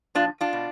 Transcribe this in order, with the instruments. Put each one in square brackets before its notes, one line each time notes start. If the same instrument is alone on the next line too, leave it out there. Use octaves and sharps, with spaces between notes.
[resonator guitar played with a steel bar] A#2 F3 D4 F4
D4 F4
B2